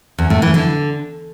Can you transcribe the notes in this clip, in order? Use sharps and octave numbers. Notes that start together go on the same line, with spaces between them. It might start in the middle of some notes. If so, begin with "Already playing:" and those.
E2
A2
E3
D3